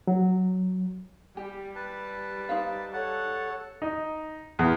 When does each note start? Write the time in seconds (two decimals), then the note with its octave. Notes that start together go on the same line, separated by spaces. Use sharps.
0.07 F#3
1.37 G3 G4
1.75 B4 A5
2.49 D#4 C5 F5
2.93 A4 C#5 F#5 A5
3.82 D#4
4.59 E2